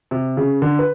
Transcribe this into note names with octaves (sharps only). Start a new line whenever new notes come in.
C3
C#3
D3
B4